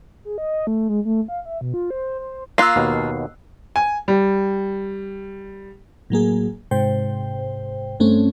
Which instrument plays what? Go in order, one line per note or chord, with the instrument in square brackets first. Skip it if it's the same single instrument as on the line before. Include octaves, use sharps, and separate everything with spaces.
[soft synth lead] G#4
D#5
A3
G#3
A3
F5
E5
B2
F4
C5
C5
[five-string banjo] A#3 F4 [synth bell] E6 F#6 C7
[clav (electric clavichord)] D#2 B2
[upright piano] G#5
G3
[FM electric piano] A2 F#3 A#3 G#4
G#2 C3 C5 G5
G2 A3 C4 C#4